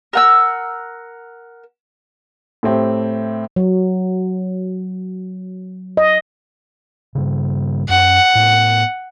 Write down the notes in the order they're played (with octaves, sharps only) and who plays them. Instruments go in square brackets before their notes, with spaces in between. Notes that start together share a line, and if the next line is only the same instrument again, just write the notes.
[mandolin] A#4 F#5 E6
[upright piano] A2 A3 C4 G4
[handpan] F#3
D#5
[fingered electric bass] G2 C#3
[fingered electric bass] F#2 [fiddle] F#5
[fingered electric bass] A2 B3